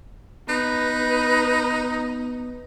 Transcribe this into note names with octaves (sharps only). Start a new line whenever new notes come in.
B3 D#4 B4